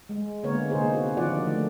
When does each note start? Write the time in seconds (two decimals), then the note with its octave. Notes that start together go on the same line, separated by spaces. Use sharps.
0.09 G#3
0.44 D3 G#3 A#3 B3 A#4 C#5
0.70 C3 A#3 D#4 G#4 C5
0.94 F#4
1.17 D3 D#3 F3 F4 D5 F#5
1.45 F3 A3